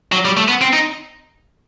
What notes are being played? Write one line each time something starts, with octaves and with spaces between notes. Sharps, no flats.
F#3
G3
A3
B3
C4
D#4